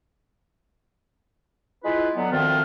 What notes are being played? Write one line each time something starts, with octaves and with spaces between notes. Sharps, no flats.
G#3 E4 F4 B4
D3 F#3 B3
D2 D#3 F3 C4 F4